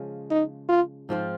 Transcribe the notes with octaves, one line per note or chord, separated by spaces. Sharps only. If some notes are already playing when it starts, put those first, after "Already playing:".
Already playing: C#3 F3 G#3
D#4
F4
G#2 F3 C4 F4